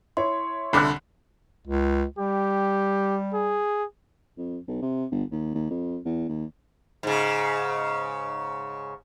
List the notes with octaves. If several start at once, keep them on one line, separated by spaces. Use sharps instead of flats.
E4 C#5 C6
C2 D3 B5 D6 F#6
C#2
G3 G4
G#4
F2
B1
C3
G1
D#2
D#2
F2
E2
D#2
G#2 C#3